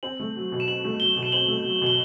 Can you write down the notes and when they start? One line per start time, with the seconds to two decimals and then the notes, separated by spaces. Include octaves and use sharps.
0.03 C4 F#7
0.20 A3
0.36 F#3
0.52 B2
0.60 E7
0.68 C4 F#7
0.84 A3
1.00 F#3 G7
1.16 B2
1.23 E7
1.32 C4 F#7
1.48 A3
1.64 F#3
1.82 B2 G7